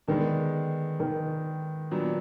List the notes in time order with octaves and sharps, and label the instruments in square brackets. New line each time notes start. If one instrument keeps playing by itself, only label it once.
[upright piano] D3 G#3 B3 D4 [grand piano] D#3
[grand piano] D#3
[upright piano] A#2 F#3 B3 D4